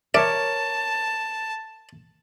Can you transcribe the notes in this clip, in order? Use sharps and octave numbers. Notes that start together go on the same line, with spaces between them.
A#4 C#5 D5 E5 A5